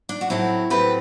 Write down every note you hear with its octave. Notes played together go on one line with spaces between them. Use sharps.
D4
F#4
A2 F#3 C4 E4
A2 F#3 C4 G4 B4